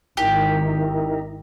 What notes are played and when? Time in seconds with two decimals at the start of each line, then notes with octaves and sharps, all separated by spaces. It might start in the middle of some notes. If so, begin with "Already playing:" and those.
0.17 G#1 D#3 D#4 E4 G4 A#4